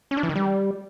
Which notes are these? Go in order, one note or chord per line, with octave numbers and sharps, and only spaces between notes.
C#4
D4
E3
D#3
G3